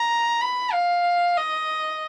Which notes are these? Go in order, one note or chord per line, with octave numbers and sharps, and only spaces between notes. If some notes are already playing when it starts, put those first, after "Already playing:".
Already playing: A#5
B5
F5
D#5